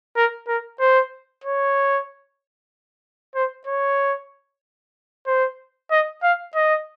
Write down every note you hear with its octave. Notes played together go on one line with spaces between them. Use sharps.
A#4
A#4
C5
C#5
C5
C#5
C5
D#5
F5
D#5